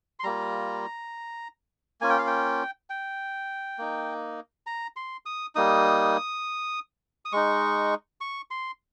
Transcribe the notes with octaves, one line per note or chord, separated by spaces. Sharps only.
C6
G3 A#3 F4 A#5
A#3 C#4 F4 G#5
G5
F5
G5
G5
A#3 D#4
A#5
C6
D#6
G3 A#3 D#4 D#6
D#6
G#3 D#4 C#6
C#6
C6